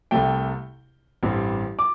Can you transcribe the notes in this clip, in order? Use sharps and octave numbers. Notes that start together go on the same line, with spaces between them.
C2 C3 A3 G5
A1 G2 G3 C4
D6